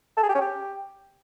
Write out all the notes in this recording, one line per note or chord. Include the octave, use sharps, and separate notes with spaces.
A4
G#4
G4
C#4
G4